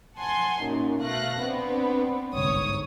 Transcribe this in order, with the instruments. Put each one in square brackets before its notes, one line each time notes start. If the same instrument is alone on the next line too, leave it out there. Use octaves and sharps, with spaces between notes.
[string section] F#5 G#5 A5 C6
F#2 A#2 D#4
B2 A3 F5 F#6 A#6
B3 C4 D4
G1 C2 G#2 C#5 D#6